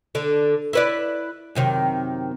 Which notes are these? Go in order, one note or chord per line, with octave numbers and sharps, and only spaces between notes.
D3 D4
E4 B4 D5
F#2 C3 D#3